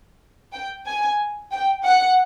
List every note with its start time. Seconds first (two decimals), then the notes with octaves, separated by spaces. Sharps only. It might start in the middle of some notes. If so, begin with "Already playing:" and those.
0.52 G5
0.86 G#5
1.52 G5
1.84 F#5